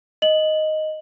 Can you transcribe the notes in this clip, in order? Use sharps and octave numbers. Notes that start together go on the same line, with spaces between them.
D#5 F#7